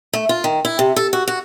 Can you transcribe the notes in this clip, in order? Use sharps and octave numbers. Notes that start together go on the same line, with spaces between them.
A3
F4
D#3
E4
C3
A4
F#4
F#4